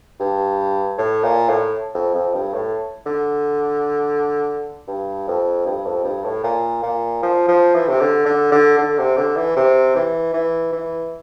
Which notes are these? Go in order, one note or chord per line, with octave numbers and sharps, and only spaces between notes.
G2
A2
A#2
A2
F2
F2
G2
A2
D3
G2
F2
G2
F2
G2
A2
A#2
A#2
F3
F3
E3
C3
D3
D3
D3
D3
C3
D3
E3
C3
E3
E3
E3